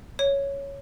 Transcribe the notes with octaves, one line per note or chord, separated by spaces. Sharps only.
C#5